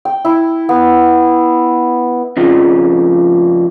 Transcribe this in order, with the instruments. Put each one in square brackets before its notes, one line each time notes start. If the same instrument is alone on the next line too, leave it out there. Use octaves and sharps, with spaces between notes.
[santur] G5
E4
B3
[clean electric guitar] F2 C#3 F3